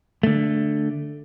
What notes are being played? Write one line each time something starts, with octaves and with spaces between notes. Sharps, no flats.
D3 A3